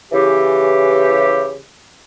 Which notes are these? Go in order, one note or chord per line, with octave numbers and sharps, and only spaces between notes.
C#3 E3 G4